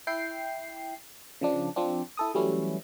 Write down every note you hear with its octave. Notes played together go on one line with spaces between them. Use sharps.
E4 G5 C7
C#3 F3 D4
F3 C4 D4
E4 A4 D#6
E3 F#3 G3 A3 C#4 E4